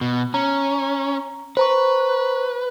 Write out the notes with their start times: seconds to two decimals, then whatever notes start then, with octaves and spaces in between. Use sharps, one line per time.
0.01 B2
0.34 C#4 A#5
1.57 B4 C5 A#5 C#6